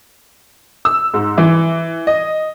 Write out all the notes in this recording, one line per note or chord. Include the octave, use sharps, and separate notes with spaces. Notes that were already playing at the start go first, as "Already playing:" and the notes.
E6
G#2
E3
D#5